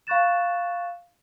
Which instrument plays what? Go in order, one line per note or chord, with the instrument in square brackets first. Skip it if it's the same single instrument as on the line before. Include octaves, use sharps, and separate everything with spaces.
[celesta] F5 B5 C#6 F#6 A6 E7